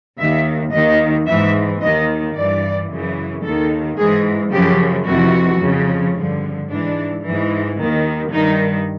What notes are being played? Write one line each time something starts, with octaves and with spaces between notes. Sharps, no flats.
D#2 D#3 E5
D#2 D#3 D#5
G#2 E3 E5
D#2 D#3 D#5
G2 E3 D5
F#2 C#3 E3
D#2 D#3 A4
G#2 E3 G#4
F#2 C#3 F3 G4
F2 C3 E3 F#4
F2 C#3 F3
G2 D3 F3
G#2 E3 D4
G#2 E3
D#2 D#3
G2 D#3 D#4